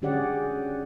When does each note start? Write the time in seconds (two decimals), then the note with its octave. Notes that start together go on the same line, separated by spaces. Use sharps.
0.02 D3 C#4 G4 G#4 D5 F#5